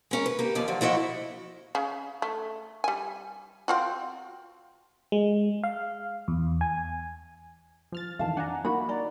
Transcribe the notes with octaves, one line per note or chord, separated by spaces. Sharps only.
G#3 C#4 A#4
B4
A#3 G4
D#2 F3 D5
D3 F3 F#3
F3 E4 F#4 D#5 E5
C#3
A3
G3 G#5
C4 F4 F#4
G#3
F5
E2
G#5
F3 F6 A6
F2 D#3 E3 F5 A5
D4 F#5 G#5 A#5
A#3 D#4 F#4 B5
D5 A#5